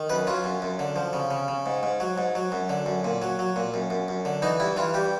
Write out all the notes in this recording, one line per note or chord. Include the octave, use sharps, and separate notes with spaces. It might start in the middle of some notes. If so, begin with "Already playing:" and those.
Already playing: D#3
F#2 B4
F#3 F4
F#2
F#2
D3
F3
C#3
C#3
C#3
G#2
G#2
F#3
G#2
F#3
F#2
D3
F#2
A#2
F#3
F#3
A#2
F#2
F#2
F#2
D3
E3 D#4
G2 E4
E3 F4
G2 G4